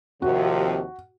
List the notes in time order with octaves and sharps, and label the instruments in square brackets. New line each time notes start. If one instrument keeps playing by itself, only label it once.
[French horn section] D#2 C3 F3 [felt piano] F#4